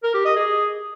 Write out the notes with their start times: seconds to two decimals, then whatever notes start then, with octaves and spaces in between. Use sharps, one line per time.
0.04 A#4
0.14 G4
0.25 D#5
0.36 G#4